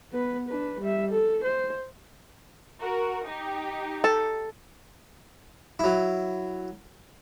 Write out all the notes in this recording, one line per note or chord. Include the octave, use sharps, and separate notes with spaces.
B3 B4
D4 B4
G3 E5
A4
C5
F#4 A#4
D#4 G4
A4
F#3 E4